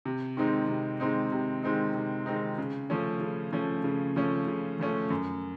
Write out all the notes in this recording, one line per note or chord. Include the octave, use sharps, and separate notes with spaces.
C3
D#3 G#3 C4 D#4
C3
D#3 G#3 C4 D#4
C3
D#3 G#3 C4 D#4
C3
D#3 G#3 C4 D#4
C#3
F3 A3 C#4
C#3
F3 A3 C#4
C#3
F3 A3 C#4
C#3
F3 A3 C#4
F#2